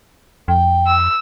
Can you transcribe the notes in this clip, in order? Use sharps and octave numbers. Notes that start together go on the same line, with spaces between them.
F2 G5
E6